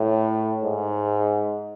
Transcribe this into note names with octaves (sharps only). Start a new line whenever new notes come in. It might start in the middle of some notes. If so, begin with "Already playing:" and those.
Already playing: A2
G#2